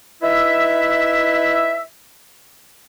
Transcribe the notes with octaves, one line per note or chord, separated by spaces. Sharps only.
D#4 E4 B4 E5